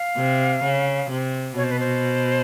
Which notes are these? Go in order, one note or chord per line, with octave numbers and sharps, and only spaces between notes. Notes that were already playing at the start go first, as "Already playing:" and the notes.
Already playing: F5
C3
C#3
C3
B2 C#5
C5
B4
C5